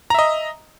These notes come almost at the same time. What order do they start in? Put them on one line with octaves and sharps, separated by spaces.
A#5 E5 D#5